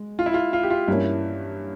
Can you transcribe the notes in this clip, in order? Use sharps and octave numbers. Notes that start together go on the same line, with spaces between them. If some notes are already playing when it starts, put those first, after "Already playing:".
Already playing: G#3
F4
E4
F4
F4
G4
F4
G2 E3 A#3 C#4 E4